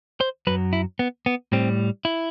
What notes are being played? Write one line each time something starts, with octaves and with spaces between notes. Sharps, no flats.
C5
F#2 F#3 B4
E4
B3
B3
A2 G3 C4
E4